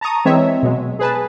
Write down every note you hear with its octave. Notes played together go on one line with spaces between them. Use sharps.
A5 A#5 C#6 D#6
E3 G#3 C4 C#5 E5
B2 F#3 G#3
G#4 B4 A5